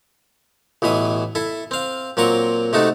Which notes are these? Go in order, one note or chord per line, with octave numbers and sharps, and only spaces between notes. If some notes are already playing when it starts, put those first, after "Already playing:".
A1 B2 E3 E5 D#6
E4 A4 E5
C4 F5
A#2 F#3 C4 A#5 C#6 D6
C3 A3 D#4 F#4 A4